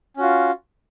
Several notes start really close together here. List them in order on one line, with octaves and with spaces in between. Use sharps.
C#4 F#4 F4